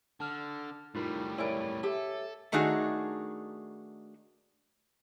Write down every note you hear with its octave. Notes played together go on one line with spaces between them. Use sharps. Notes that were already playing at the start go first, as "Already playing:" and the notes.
D3 A5 F6
A2 G3 D#4 F4 A#4
E4 A#4 C#5 D5 G#5
G4 A4 E5
D#3 A3 D4 D#4 F#4 G#4